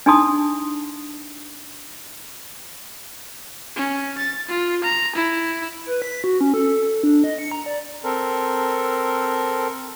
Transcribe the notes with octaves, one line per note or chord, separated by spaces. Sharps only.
D4 D#4 G#4 A5 C6 D#6
C#4
A6
F4
A#5
E4
B4
B6
F#4
C#4
A4
D4
D#5
C#7
A#5
D5
C4 A4 A#4